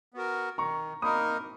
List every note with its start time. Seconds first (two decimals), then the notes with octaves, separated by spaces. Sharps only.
0.14 B3 F#4 A#4
0.58 D#3 A#5 C#6
1.02 A#3 D#4 A#4 B5 D#6